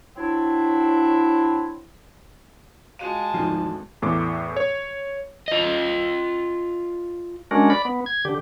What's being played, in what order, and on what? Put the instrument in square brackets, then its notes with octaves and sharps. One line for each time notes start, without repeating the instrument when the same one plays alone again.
[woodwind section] F#3 C4 D4 E4
[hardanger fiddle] G#3 A5 [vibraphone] F4 F#4 F5 [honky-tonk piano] D#7
[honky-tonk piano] G#1 D2 [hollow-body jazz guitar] F3 [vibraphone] D#4
[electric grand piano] E2 A2 D6
C#5
[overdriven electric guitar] F4 D#5
[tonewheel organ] G#3 C#4 D4 F#4 A#4
D5 B5
B3
G#6
D3 G4